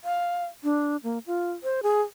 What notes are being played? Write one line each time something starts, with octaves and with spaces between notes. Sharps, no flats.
F5
D4
A#3
F4
C5
G#4